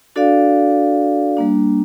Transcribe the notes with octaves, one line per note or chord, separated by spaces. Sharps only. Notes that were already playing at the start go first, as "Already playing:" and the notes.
D4 F#4 A4 D5 F5
G3 A#3 D4